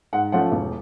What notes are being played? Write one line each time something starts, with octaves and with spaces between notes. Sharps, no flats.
G#2 F#5
F3 A3 C#4 F4 F#5
E1